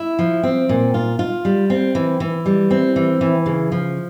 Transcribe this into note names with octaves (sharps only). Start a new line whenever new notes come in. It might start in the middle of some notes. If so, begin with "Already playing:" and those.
Already playing: E4
F3
C4
A#2
F4
F4
G3
C4
E3
E3
G3
C4
E3
E3
C#3
F3